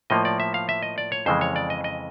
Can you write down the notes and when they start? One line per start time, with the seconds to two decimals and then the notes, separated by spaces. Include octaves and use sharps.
0.10 A2 F3 A#3 D#5
0.25 D5
0.40 E5
0.54 F5
0.69 E5
0.83 D#5
0.98 D5
1.12 C#5
1.26 F2 C#3 E3 G#3 C5
1.41 C#5
1.56 D5
1.70 D#5
1.84 D#5